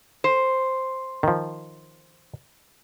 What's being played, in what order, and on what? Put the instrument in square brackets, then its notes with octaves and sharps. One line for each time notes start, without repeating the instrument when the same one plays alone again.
[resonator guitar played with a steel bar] C5
[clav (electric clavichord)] D#3 F3